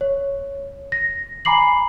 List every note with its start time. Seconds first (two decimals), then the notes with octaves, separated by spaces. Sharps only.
0.01 C#5
0.92 A#6
1.45 G#5 A#5 B5 D6 C7 F#7